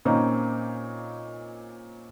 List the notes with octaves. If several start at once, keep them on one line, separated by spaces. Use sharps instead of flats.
A#2 A#3 C4 C#4 D#4